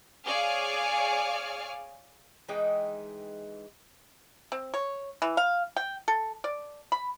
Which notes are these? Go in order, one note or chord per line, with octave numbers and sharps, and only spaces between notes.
G#4 C#5 D5 F5 G#5 F6
E3 G#3 D#4 G5
C4
C#5
E3
F5
G5
A4
D5
B5